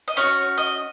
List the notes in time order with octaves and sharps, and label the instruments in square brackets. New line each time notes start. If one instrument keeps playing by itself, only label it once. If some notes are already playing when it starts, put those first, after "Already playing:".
[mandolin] D#5
C#4 F#4 C#5
D#5